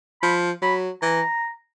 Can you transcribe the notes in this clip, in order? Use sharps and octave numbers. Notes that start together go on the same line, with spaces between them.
F3 B5
F#3 B5
E3 A#5